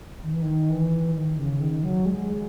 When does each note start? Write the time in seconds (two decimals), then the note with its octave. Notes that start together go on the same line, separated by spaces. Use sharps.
0.24 D#3
0.33 E3
0.42 D#3
0.70 E3
1.15 D#3
1.38 C#3
1.60 D#3
1.83 F#3
2.06 G#3